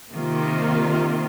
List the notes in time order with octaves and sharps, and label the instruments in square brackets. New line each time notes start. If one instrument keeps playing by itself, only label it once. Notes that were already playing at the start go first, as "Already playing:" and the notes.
[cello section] C3 D#3 A#3 F4